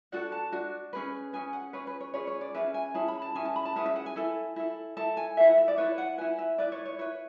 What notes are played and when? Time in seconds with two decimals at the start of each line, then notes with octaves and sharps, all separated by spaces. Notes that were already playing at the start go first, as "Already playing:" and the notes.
0.12 D4 F#4 A4 F#5
0.32 A5
0.52 D4 F#4
0.93 C#4 G#4 B4
1.33 C#4 G#4 B4 G#5
1.53 F#5
1.73 C#4 G#4 B4 C#5
1.87 B4
2.01 C#5
2.14 C#4 G#4 B4 C#5
2.27 C#5
2.41 D5
2.54 C#4 E4 G#4 B4 E5
2.74 G#5
2.94 C#4 E4 G#4 A5
3.08 B5
3.22 A5
3.35 C#4 E4 G#4 G#5
3.45 A5
3.56 B5
3.65 A5
3.76 C#4 E4 G#4 B4 F#5
3.86 E5
3.96 F#5
4.06 G#5
4.16 E4 A4
4.56 E4 A4
4.97 E4 A4 A5
5.17 G#5
5.37 E4 A4 E5
5.47 F#5
5.58 E5
5.68 D5
5.77 E4 B4 C#5
5.98 F#5
6.18 E4 B4 G#5
6.38 E5
6.58 E4 B4 D5
6.72 C#5
6.85 C#5
6.99 E4 B4 C#5